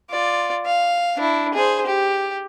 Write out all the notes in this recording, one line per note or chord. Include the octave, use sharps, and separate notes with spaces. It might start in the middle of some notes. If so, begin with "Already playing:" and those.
F4 D5
F5
D4 E4
G#4 C5
G4